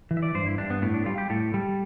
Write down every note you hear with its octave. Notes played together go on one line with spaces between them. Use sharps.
E3
E5
D5
G2 C5
E4
G2 D4
B3
A2 B3
D4
G3 F4
G4
A2 A4
G3